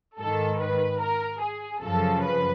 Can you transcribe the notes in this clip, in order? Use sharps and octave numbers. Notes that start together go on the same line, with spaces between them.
G#2 D#3 A4
B4
A#4
G#4
F#2 C#3 F3 A4
B4